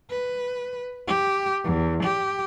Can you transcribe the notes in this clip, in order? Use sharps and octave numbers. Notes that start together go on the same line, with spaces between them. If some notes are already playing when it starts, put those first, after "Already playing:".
B4
G4
E2
G4